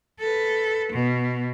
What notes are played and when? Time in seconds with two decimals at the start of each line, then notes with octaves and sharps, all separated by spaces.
0.19 A4 B4
0.92 B2